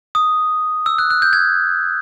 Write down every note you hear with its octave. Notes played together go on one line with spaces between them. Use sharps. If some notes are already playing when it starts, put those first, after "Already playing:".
D#6
E6
F#6
F#6
G6
G#6